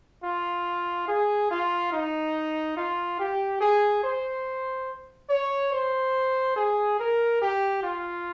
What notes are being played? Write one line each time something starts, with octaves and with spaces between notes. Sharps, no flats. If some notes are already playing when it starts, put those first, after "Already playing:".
F4
G#4
F4
D#4
F4
G4
G#4
C5
C#5
C5
G#4
A#4
G4
F4